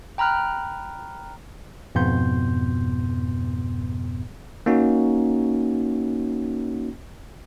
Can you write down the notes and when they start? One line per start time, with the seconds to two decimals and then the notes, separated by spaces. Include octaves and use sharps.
0.18 G5 A#5 B5 F6 F#6
1.95 F2 G#2 B2 B3 C6 G6
4.66 A#3 C#4 D#4 F#4